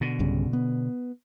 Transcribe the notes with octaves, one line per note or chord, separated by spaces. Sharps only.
B2 D3
B1 G2 C#3
B3